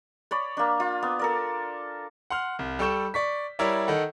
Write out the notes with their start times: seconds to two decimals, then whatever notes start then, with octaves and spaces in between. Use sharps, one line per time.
0.31 C#5 D5 B5
0.57 A#3 D4
0.80 F4
1.03 B3
1.19 A4 A#4 D5
2.30 F#5 C6 F6
2.59 C2
2.79 G3 A4 G5 C#6 G6 E7
3.14 D5 C#6 B6
3.59 G3 E4 A#4 C#5 D5 E5
3.88 D#3 A4 F#5